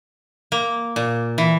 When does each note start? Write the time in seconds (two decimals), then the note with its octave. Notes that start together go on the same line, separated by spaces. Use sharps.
0.52 A#3
0.96 A#2
1.38 E3